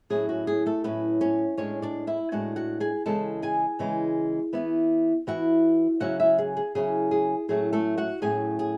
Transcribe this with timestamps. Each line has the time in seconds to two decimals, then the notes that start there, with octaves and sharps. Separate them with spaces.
0.10 A2 F#3 C#4 E4 G#4
0.29 F#4
0.47 G#4
0.66 A3 A4
0.84 A2 F#3 B3 C#4 E4 B4
1.21 C#4 C#5
1.58 A2 G#3 C#4 D4 C#5
1.82 D4 D5
2.07 E4 E5
2.32 A2 G#3 D4 F#4 F#5
2.56 F#4 F#5
2.80 G#4 G#5
3.06 C#3 E3 G#3 C#4 A4 A5
3.42 G#4 G#5
3.79 C#3 E3 G#3 C#4
4.53 E3 B3 E4
5.27 E3 B3 E4 F#4 F#5
6.00 C#3 F#3 C#4 E4 F#4 F#5
6.20 E4 E5
6.38 G#4
6.57 G#4
6.75 C#3 F#3 C#4 E4 G#4
7.11 G#4
7.48 A2 F#3 A3 C#4 G#4
7.73 A3 A4
7.98 F#4 F#5
8.22 A2 F#3 A3 C#4 G#4 G#5
8.59 G#4 G#5